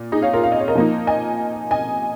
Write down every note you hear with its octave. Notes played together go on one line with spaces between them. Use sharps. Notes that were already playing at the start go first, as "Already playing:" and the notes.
Already playing: A#2
D#4 G#4
C#5 F5
F4 A#4
F5
D#5
C#5
A#4 D#5
F3 A#3 D#4
D#5 G#5
D#5 G#5